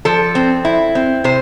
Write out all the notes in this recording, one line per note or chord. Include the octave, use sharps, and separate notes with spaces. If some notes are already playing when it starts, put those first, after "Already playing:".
F3 A4
C4
E4
C4
C3 C5